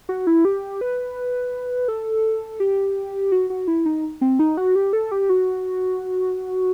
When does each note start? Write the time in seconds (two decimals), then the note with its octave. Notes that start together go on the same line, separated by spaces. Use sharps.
0.09 F#4
0.27 E4
0.45 G4
0.81 B4
1.88 A4
2.60 G4
3.32 F#4
3.50 F#4
3.68 E4
3.86 D#4
4.21 C4
4.39 D#4
4.57 F#4
4.75 G4
4.93 A4
5.11 G4
5.29 F#4